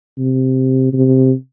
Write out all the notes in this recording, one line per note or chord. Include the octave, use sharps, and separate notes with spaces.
C3
C3